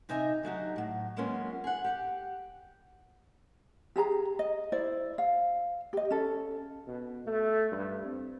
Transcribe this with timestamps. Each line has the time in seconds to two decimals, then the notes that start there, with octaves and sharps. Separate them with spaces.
0.09 C3 D#4 E5 G#5
0.43 D3 F#3 D#4 G4
0.76 A2 F#3
1.17 F#3 G#3 A#3 B3 C#4 F4
1.64 G#4 F#5
1.84 G4 F#5
3.96 G4 G#4 A5 A#5
4.39 D#5
4.72 E4 C5 D5
5.18 F5
5.93 G4 D#5
6.10 C#4 A4
6.87 B2
7.26 A3
7.72 G2
8.06 C4